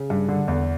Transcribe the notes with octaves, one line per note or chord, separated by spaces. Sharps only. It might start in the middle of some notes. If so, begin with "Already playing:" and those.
Already playing: C#3
G2
D3
E2